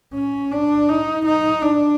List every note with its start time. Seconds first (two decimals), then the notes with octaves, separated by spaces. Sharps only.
0.14 C#4
0.52 D4
0.89 D#4
1.26 D#4
1.63 D4